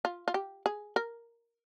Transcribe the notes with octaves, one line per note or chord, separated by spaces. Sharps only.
F4
F4
G4
G#4
A#4